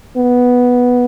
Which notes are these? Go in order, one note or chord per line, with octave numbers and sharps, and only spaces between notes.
B3